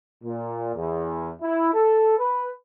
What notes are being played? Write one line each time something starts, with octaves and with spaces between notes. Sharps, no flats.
A#2
E2
E4
A4
B4